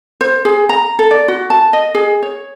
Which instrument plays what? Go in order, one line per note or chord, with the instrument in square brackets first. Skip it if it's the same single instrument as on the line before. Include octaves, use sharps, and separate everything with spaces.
[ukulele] C5
G#4
A#5
A4
D5
F#4
A5
D#5
G#4
C#5